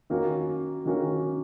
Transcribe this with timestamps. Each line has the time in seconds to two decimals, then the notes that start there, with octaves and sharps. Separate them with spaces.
0.10 D#3 A#3 C#4 F#4
0.85 D#3 A#3 C#4 F#4